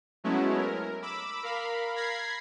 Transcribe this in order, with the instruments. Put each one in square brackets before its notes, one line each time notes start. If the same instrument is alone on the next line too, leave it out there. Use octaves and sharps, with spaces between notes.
[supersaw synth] F#3 G#3 A3 B3 C#4 E4
A#4
B5 D6 E6
A#4 F5 B5
B5 G#6 A#6 C7